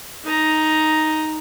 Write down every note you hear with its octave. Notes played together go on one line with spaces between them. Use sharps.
D#4 A#5